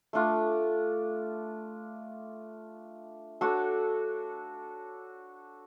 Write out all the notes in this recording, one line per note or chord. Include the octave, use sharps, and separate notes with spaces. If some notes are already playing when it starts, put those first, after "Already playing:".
A3 D4 F4
D4 F#4 A4 C#5